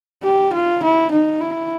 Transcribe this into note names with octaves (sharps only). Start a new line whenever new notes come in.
G4
F4
E4
D#4
E4